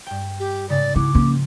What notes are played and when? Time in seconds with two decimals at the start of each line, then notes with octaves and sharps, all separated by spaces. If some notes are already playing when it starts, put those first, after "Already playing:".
0.07 G2 G5
0.39 G4
0.69 G#2 C#3 D5
0.96 C#4 E4 F#4 D6
1.15 F3 A#3 C#4